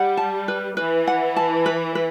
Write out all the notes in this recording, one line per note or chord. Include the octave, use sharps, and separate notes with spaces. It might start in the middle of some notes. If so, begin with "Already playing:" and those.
Already playing: G3 F#5
A5
B4
E3 B4
F#5
A5
B4
B4